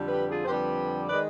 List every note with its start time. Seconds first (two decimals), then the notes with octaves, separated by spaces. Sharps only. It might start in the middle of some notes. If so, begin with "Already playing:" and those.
Already playing: F2 D3 G3
0.08 G4 B4
0.28 F4 G#4
0.45 C5
0.48 F2 D3 G3 G4 B4
1.08 D#3 G#3 B4 D5